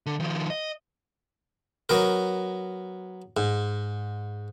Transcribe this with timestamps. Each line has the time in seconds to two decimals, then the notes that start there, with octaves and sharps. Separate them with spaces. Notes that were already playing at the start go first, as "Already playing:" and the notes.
0.06 D3
0.20 D#3 F3
0.50 D#5
1.89 F#3 B3 A#4
3.37 G#2